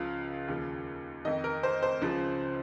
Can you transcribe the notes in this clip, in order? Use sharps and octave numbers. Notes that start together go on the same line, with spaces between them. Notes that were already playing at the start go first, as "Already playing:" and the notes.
Already playing: C#2 C#3 F3 F5
D#2 C#3 F3
F2 D#3 D#5
A#4
C5
C5
C#2 C#3 F3